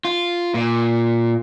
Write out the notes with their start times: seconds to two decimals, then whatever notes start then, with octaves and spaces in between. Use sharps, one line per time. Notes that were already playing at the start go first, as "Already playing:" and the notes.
0.05 F4
0.54 A#2